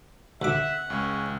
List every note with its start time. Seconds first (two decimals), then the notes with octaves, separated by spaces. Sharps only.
0.42 D2 E5 F#5 D6
0.90 C#2 C#4